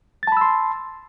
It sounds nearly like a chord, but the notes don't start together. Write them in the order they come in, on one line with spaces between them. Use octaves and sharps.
A6 A5 B5 E6 C6